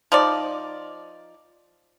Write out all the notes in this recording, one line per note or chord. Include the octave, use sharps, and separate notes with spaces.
F3 D#4 D5